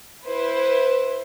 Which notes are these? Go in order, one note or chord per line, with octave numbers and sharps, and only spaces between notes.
E4 B4 C5